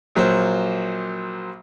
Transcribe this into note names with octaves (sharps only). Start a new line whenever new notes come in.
A#1 F#3 A#3 C5